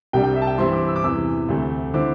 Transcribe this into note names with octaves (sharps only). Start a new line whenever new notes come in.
C2 C3 G3 D4 G5
G5
E5
A5
G5
G2 E3 C4 E4 C6
D6
E6
D6
E2 C3 E3 E6
D2 C3 A3
D3 C4 E4 D6